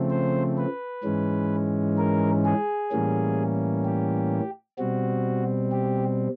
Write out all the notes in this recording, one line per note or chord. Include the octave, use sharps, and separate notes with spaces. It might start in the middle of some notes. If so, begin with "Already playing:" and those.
Already playing: C#3 F3 A3 C4
C5
B4
G#2 E3 G#3 C#4
A#4
G#4
A2 E3 G3 A#3 C#4
G4
B2 G3 C4 F#4
G4